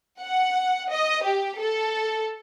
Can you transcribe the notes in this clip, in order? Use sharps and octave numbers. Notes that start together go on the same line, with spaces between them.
F#5
D#5
G4
A4